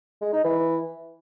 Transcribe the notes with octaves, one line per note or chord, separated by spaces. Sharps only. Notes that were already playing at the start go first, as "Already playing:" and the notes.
G#3
D#4
E3